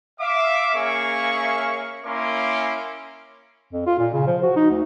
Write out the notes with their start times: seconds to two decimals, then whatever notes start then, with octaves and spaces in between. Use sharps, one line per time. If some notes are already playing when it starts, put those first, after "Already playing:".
0.20 E5 F5 D6
0.74 A#3 C#4 G#4 E5 F5 C#6
2.06 A#3 C#4 E4 A#4 C6 D6
3.73 F2
3.87 F4
3.99 A#2
4.14 C#3
4.27 F3
4.43 F#4
4.56 D#4
4.71 D2